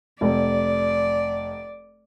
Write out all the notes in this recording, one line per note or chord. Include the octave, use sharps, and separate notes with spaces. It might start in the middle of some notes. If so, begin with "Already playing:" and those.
F1 D5